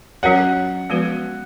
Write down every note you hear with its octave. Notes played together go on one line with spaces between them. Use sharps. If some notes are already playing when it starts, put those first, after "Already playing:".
F#3 C#4 F#4 A#4 C#5 F#5
F3 G#3 B3 F#4 B4